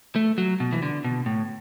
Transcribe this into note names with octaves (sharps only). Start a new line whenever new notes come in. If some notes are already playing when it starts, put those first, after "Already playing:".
A3
F#3
B2
E3
D3
B2
A2